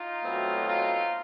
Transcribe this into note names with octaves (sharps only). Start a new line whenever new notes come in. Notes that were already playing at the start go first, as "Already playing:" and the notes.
Already playing: D#4 F4
B2 F#3 A3 C4
D#4 F4